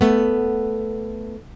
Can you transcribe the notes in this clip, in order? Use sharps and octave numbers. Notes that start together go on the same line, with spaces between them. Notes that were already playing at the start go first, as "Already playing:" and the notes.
A3 B3